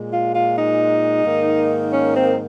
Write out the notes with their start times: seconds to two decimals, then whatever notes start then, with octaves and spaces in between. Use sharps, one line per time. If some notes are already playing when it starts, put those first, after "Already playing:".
Already playing: A#2 G#3
0.10 F4
0.33 F4
0.56 D#4
1.24 G#2 D#3 A#3
1.92 C#4
2.15 C4